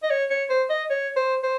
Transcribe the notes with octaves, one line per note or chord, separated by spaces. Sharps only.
D#5
C#5
C#5
C5
D#5
C#5
C5
C5